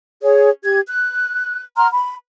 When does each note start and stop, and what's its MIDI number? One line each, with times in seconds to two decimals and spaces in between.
0.22 0.49 68
0.22 0.49 73
0.64 0.79 67
0.64 0.79 92
0.87 1.62 90
1.77 1.87 78
1.77 1.87 82
1.77 1.87 84
1.77 1.87 89
1.92 2.15 83